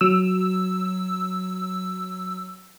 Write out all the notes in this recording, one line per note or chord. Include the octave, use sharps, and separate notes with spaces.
F#3 E6